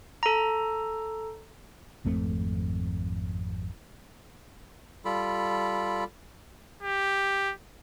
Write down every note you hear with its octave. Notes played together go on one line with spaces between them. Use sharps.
A4 A#5
G#1 F2 A3 C4
G3 F4 A4 B5
G4